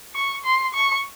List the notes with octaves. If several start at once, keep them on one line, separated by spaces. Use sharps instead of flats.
C#6
C6
C#6